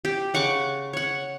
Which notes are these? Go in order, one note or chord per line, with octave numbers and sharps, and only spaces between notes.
G4
C#3 F#5 C#6 D6
C#5 F#5